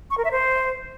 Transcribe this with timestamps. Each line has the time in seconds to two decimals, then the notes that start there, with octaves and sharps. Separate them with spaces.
0.11 C#6
0.18 A#4
0.25 E5
0.31 C5